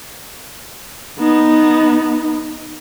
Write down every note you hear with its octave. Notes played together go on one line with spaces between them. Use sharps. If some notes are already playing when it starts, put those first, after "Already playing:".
B3 D#4